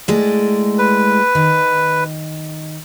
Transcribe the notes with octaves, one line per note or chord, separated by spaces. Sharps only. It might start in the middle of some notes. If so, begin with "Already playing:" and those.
A2 G#3 D5
B4
D#3